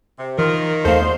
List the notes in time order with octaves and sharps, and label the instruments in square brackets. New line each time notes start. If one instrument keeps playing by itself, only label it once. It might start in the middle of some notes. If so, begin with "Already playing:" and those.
[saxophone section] C3
[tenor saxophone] D#3 [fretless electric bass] E3 [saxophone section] F4 A#4
[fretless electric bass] D#2 A3 [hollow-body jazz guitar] A4 F5 [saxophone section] C5
[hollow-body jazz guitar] E2